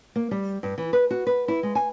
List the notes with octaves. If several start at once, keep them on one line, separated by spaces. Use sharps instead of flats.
A#3
G3
G2
E3
B4
F#4
B4
E4
G#3
G#5